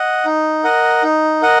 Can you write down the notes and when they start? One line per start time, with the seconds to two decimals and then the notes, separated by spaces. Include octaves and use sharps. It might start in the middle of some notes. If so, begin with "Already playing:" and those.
Already playing: D#5 F#5
0.25 D#4
0.64 A#4 D#5 F#5
1.03 D#4
1.42 A#4 D#5 F#5